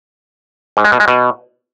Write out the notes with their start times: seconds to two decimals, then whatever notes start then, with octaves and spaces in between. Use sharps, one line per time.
0.77 G#2
0.85 G#3
0.92 B2
1.00 G#3
1.08 B2